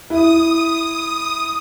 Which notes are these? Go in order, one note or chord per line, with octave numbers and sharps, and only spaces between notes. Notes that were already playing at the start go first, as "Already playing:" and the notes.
E4 D#6